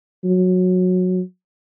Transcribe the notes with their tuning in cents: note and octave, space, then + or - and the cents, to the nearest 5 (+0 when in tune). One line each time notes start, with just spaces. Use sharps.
F#3 -15